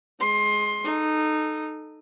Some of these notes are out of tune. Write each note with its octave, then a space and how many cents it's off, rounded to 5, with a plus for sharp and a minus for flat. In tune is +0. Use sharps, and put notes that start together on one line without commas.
G#3 +10 C6 +20
D#4 -15 A4 +0